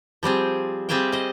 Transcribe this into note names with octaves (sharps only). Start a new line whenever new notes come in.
F3 G3 C4 G#4
G3 C4 G#4 E5 F5 G5
C5 D#5